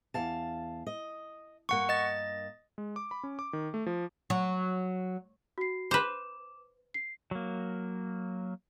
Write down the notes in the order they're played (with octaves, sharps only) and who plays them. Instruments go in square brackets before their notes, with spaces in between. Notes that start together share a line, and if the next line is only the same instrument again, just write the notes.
[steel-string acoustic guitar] E2 F5 A5
D#5
[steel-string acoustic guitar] G2 A#3 [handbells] F#5 C#6
[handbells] D#5 A6
[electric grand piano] G#3
D6
B5
C#4
D6
D#3
A3
F3
[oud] F#3
[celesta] F#4 C7
[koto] B4 C5 [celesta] D6 E7
[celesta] C7
[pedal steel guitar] F#3 A#3